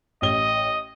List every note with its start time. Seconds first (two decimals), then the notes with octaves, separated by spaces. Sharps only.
0.22 A1 D#5 G7